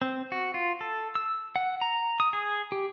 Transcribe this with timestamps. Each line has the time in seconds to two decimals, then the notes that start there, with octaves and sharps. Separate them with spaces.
0.02 C4
0.32 F#4
0.54 F4
0.81 A4
1.15 E6
1.56 F#5
1.81 A#5
2.20 D#6
2.33 G#4
2.72 G4